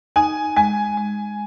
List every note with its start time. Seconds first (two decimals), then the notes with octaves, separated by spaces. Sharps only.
0.16 D#4 G#5
0.56 G#3 G#5
0.98 G#3